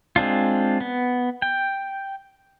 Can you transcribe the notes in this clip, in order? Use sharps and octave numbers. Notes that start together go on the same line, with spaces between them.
G#3 C4 D4 F4
B3
G5